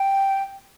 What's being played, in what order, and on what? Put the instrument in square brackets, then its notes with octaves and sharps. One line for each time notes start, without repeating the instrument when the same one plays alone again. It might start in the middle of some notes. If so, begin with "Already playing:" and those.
Already playing: [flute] G5